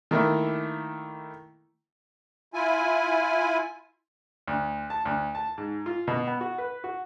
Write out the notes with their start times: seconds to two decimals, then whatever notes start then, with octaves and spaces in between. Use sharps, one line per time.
0.11 D#3 A3 A#3 E4
2.54 E4 F4 G#5
4.47 D2
4.90 A5
5.05 D2
5.35 A5
5.58 G#2
5.86 F4
6.08 B2
6.27 B3
6.41 F#4
6.58 B4
6.84 F#4